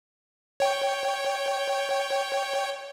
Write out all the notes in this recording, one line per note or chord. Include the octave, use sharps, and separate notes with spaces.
C#5 G5